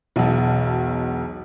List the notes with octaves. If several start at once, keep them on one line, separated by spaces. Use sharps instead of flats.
E1 B1